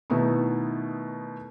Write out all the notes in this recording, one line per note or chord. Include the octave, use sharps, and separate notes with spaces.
B2 D#3 A3 B3 D#4 E4